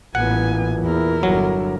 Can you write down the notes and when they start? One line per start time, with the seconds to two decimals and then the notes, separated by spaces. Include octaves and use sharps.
0.15 A1 A#2 E3 B3 F#5 G#5
0.82 E2 E4 A#4
1.23 G1 D3 F#3